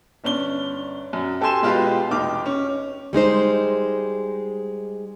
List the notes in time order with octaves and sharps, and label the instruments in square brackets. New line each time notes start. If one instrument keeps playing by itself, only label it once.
[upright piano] G1 C#4 D4 G7
F#2
G4 A4 G5 G#5 C6 E7
B2 G#3 F4 G4 B4
F1 D#4 G5 D6 F6
C#4
[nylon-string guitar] G3 G#3 D#4 C5